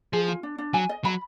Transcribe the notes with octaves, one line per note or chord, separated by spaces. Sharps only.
F3 G#4
F4
D4
D4
F#3 G#5
D#5
F#3 B5